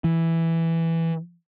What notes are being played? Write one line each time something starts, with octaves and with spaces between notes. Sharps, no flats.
E3